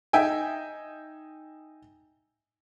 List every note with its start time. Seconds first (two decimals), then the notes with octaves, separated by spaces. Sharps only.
0.13 D#4 E5 G5 G#5